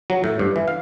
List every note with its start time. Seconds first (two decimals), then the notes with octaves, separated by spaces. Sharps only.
0.10 F#3
0.24 A2
0.39 G2
0.56 E3
0.68 F5